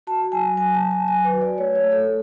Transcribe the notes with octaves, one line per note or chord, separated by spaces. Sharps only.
F#4 A5
F#3 G#5
F#3 G#5
A5
F#3
G#5
F#3 G#5
B4
F#4
D5
A3 C#5
C#5
A3
A4